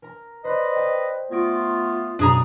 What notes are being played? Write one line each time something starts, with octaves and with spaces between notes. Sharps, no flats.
A#4 A#5
B4 C5 D5 D#5
G5 D#6
A3 B3 F4 G#6 A#6 D7
F#2 B2 D4 G#4 A#5